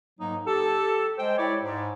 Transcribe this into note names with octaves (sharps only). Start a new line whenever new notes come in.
G#2 F#3 A#3 D#4
G4 A4
G#3 C5 G5
E4 C#5 D5
G#2